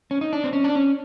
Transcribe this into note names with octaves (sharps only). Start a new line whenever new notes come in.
C#4
D#4
D4
C4
C#4
D4
C#4